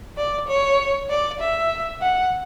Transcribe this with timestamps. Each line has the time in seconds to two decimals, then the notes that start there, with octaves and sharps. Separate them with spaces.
0.17 D5
0.48 C#5
1.10 D5
1.40 E5
2.02 F#5